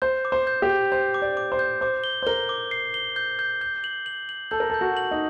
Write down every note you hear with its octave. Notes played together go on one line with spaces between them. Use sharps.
C5 G6
D6
C5
G6
G4
G6
C5 G6
D6
D5
D6
C5
G6
C5 D6
G7
C5
A#4 G7
D6
C7
G7
G6
G6
G6
F#7
F#7
F#7
A4 G6
A#4
A4
G6
F#4
F#7
D#4